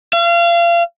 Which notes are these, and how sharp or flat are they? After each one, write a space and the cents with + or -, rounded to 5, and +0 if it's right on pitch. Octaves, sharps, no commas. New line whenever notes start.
F5 -30